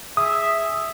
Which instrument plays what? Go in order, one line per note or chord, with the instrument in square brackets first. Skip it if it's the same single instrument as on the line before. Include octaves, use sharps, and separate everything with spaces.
[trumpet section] G#4 E5 [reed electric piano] D#6